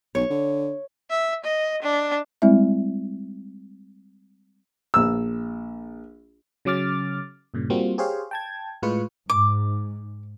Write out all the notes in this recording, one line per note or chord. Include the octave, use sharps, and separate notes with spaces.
B1 C#5
D3
E5
D#5
D4
G3 G#3 C4 E4 E5
A#1 E6
C#3 F#3 C#4 D6 F6 A6
G2 A#2 C#3
G3 A#3 C4 F4 F#4
G4 G#4 C5 C#5 F5
G5 A5 G#6
A2 G#3 F4 B4 C#6
G#2 D6